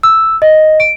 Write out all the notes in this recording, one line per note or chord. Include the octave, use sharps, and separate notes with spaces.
E6
D#5
D7